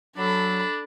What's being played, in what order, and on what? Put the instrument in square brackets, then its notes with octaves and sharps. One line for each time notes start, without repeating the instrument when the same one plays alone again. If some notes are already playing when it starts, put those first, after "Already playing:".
[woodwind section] F#3 [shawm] D4 [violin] A4 B5